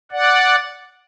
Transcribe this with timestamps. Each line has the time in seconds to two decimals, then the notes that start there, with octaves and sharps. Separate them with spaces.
0.12 D5 F#5